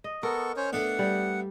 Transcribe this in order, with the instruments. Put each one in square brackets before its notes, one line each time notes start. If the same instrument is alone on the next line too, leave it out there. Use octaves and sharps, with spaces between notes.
[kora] D#5
[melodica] B3 A4 C#6 [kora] A#4
[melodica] C#4 C5 C#5
[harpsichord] A3 B3 D4 [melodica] F#5
[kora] G3